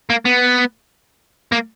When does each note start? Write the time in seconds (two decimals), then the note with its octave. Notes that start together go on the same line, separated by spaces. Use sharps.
0.10 A#3
0.25 B3
1.52 A#3